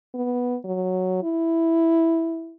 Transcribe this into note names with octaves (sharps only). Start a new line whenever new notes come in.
B3
F#3
E4